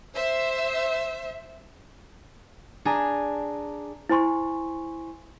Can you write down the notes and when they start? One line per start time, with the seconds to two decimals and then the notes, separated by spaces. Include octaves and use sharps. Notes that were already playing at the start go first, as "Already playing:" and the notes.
0.13 C5 E5
2.85 D4 G#4 G#5 A#5
4.09 E4 C5 G#5 C6 C#6